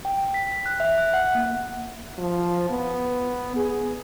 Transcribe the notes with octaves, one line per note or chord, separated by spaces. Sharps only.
G5
B6
B6
F#6
E5
F#6
F#5
A#3
F3
B3
G#4